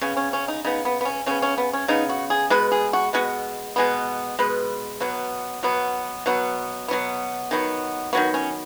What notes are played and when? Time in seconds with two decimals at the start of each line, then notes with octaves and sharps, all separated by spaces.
0.01 C#3 B3 C#4
0.17 C#4
0.33 C#4
0.48 D#4
0.64 C#3 B3 D#4
0.85 B3
1.01 B3
1.05 C#4
1.26 C#3 B3 C#4
1.42 C#4
1.58 B3
1.73 C#4
1.88 C#3 B3 D#4
2.09 F#4
2.30 G#4
2.50 B2 G#3 B3 B4
2.72 G#4
2.93 F#4
3.13 B2 G#3 B3 F#4
3.76 B2 G#3 B3
4.39 B2 G#3 B3 B4
5.00 B2 F#3 B3
5.63 B2 F#3 B3
6.26 B2 F#3 B3
6.88 B2 F#3 B3
7.51 D#3 F#3 B3
8.13 D#3 F#3 B3 F#4
8.34 C#4